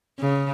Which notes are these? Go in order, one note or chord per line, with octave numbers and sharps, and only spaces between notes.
C#3